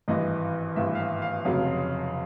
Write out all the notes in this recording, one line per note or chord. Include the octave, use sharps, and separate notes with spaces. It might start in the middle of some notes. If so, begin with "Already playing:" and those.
G#1 G2 E3 D#5
G#1 G2 E3 E5
F5
E5
F5
F1 F2 C#3 F#3